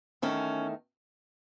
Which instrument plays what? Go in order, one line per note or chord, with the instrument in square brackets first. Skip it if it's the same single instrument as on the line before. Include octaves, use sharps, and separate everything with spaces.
[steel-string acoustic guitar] E2 D#3 A3 C#4